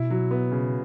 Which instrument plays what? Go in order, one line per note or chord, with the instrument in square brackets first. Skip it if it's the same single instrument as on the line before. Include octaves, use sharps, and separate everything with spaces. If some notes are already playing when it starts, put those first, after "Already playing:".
Already playing: [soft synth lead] B2 [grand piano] E4
[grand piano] F#3
B3
C#3